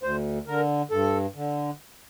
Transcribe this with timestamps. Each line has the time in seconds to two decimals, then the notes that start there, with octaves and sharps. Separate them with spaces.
0.03 D2 C5
0.47 D3 A#4
0.91 G2 A4
1.35 D3